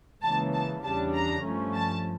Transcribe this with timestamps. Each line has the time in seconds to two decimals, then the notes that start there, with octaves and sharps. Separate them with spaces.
0.23 C#2 C#3 E3 A#3 A5
0.53 A5
0.84 E2 C#3 G3 D4 A5
1.14 A#5
1.44 G2 F3 A3 C#4
1.74 A5